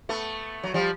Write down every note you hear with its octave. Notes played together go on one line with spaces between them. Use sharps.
A3 B3
F#3
F3 G3